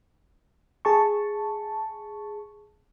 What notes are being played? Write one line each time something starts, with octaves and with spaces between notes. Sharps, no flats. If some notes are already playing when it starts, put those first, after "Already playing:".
G#4 A5 C#6